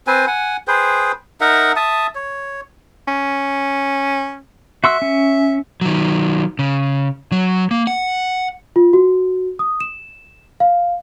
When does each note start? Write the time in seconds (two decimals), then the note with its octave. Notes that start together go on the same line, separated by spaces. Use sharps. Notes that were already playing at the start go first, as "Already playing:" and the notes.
0.07 C4 B4 C5 G#5
0.27 F#5 G#5
0.68 G#4 B4 C5 G5
1.41 D#4 A#4 E5 F#5
1.76 E5 A5 D#6
2.15 C#5
3.08 C#4
4.84 F#4 E5 C6 E6
5.02 C#4
5.81 D#3 F#3
6.59 C#3
7.32 F#3
7.71 A#3
7.87 F#5
8.76 F4
8.93 F#4
9.59 D#6
9.80 E7
10.60 F5